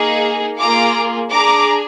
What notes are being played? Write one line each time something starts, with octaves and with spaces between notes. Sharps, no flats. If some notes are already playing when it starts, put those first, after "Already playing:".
Already playing: A#3 D#4 G#4
A#3 F4 G#4 A#5 D6
D4 G#4 A#5 D6